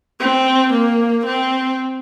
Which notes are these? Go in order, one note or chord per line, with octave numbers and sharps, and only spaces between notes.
C4
A#3
C4